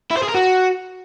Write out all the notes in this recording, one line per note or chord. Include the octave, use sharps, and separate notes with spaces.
E4
C5
G#4
A#4
F#4